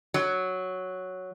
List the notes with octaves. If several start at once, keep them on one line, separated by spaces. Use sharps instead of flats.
F#3